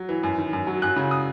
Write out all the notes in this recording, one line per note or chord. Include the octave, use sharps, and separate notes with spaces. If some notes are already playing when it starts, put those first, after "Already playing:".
Already playing: F#3
E3
F#2
D#3
F#2
F#3
F#2 F#6
C#3
D#6